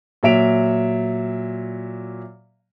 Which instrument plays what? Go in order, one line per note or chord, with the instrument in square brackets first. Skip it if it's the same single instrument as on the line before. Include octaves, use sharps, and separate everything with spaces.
[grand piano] A#2 F#3 E5 D7 F7